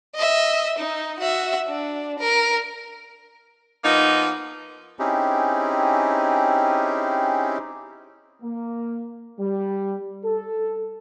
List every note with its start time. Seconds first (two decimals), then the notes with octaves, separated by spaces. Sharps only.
0.15 D#5 E5
0.78 D#4
1.19 F#4 E5
1.67 D4
2.19 A#4
3.83 F3 A#3 B3 D#4
4.99 C4 C#4 D#4 E4 G4 G#4
8.42 A#3
9.39 G3
10.25 A4